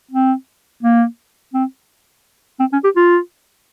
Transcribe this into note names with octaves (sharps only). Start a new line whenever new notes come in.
C4
A#3
C4
C4
C#4
G4
F4